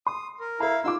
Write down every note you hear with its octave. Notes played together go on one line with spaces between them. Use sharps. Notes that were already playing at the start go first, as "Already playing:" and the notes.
C6 D#6
A#4
E4 A#4 F5 A#5
D#4 F4 C6 D6 E6